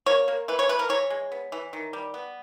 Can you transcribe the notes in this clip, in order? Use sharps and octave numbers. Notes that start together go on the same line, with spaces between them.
A#3 C#5
A#3
E3 B4
C#5
E3 B4
A#4
E3 C#5
G#3
B3
E3
D#3
G3
B3